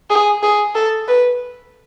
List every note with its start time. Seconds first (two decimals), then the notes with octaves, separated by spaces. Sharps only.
0.10 G#4
0.43 G#4
0.75 A4
1.08 B4